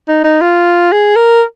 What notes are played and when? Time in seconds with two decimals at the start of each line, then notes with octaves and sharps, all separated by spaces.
0.08 D#4
0.24 D#4
0.41 F4
0.92 G#4
1.16 A#4